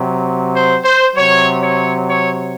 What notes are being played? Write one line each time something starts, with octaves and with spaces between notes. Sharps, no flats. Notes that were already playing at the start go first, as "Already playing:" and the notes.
Already playing: C3 F#3
C5
C5
C3 F#3 C#5
C#5
C#5